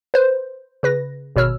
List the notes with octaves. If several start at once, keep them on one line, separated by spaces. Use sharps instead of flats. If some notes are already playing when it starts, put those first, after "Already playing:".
B4 C5
C#3 B4 A#6
G#1 B2 C#5 E6 F6